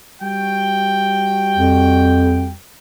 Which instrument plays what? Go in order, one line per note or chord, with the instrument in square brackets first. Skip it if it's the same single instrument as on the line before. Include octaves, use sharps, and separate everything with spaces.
[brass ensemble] G3 F#4 G5
[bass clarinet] F2